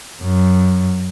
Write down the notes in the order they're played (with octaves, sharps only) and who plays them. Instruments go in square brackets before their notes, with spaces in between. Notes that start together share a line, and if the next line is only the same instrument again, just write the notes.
[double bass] F#2